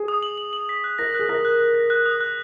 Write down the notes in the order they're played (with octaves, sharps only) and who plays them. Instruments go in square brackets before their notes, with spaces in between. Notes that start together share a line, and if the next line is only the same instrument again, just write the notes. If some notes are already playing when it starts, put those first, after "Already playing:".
Already playing: [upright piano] G#4
[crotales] D#6
F#7
F#7
F#7
B6
F#6
[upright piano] A#4 [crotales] A#6
[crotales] F#6
[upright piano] G#4
[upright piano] A#4 [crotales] A#6
[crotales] F#6
F#6
A#6
F#6
D#6
F#6